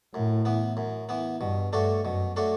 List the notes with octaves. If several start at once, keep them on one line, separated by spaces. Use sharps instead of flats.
F#2 A2
E3 B3
F#2
E3 B3
G2 B2
G2 A3 D4 F#4 C#5
F#2 B2
A3 D4 F#4 C#5